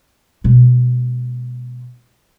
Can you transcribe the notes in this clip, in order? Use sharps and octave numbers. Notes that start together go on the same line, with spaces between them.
B2 G#3